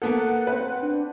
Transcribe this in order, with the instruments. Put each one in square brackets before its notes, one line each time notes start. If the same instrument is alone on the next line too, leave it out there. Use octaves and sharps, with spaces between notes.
[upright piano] A#3 B3 A4 [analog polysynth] F#5
[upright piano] C4 B4
[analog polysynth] D4